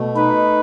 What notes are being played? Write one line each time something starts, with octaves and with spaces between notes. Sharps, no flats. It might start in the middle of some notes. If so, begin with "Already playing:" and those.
Already playing: B2 A3
D#4 B4